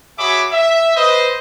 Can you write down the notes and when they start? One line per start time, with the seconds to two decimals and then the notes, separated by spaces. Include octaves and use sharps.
0.18 F#4 G#4 C#5 E5 B5 D6
0.52 E5
0.96 B4 C5 D#5